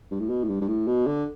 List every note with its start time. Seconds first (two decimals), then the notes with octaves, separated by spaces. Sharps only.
0.11 G2
0.20 A2
0.29 B2
0.44 A2
0.49 G2
0.61 G2
0.68 A2
0.88 B2
1.07 D3